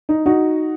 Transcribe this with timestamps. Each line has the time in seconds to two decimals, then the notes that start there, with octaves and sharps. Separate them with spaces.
0.09 D#4
0.26 D#4 F#4